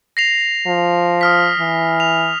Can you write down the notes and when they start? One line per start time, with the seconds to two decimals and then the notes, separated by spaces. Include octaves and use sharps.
0.17 A#6 C7 F7
0.67 F3
1.21 D#6 F6 B6
1.59 E3
2.00 F7